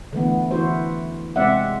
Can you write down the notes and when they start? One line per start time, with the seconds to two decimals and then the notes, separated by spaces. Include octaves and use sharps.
0.13 D3 E3 A3 B3
0.51 E3 E4 F#4 C5
1.36 C3 G#3 C4 D5 E5 F#5